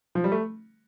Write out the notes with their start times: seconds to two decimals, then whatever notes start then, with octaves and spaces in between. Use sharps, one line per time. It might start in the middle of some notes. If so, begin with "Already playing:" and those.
0.15 F3
0.24 G3
0.32 A3